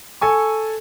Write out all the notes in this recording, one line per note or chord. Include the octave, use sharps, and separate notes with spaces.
A4 G#5 C#6